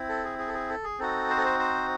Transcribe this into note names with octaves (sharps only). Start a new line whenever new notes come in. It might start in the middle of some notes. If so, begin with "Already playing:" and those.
Already playing: C4 E4
A4
G#4
G#4
A4
G#4
A4
G#4
C4 D#4 F#4 A4
C5
A4
C5
C5